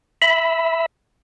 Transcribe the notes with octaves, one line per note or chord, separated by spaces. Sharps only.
E5 B5